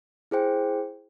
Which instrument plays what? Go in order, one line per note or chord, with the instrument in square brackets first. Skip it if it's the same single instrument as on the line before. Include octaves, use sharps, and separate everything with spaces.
[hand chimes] E4 G#4 C5 G5